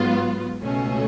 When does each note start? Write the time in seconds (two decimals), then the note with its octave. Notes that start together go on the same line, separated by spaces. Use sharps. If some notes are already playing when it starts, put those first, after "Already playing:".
Already playing: G#2 F#3 B3 F4
0.63 C#2 B2 A3 C#4